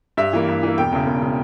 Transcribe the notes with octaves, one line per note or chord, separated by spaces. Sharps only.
G2 E5
E3 A#3
G2
E3 A#3
E1 G5
E2 C#3
E1
C#3